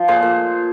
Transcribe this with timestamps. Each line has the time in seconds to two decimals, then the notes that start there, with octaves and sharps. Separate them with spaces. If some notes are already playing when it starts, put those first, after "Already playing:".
Already playing: F3
0.08 A#2 G#4 C5
0.23 A#2